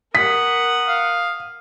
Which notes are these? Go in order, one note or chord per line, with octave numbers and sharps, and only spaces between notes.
A#4 F#5 D#6 B6
F5